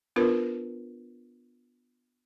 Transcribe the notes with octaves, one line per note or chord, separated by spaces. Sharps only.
B3 D4 F4 A#4 B4